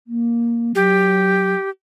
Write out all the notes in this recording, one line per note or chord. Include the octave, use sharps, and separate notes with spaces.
A#3
F#3 G4